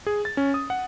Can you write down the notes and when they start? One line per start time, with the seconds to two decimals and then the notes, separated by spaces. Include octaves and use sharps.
0.07 G#4
0.25 A6
0.37 C#4
0.54 D#6
0.70 F#5